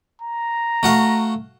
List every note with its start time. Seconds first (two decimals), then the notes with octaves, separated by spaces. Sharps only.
0.22 A#5
0.83 A3 F#4 F5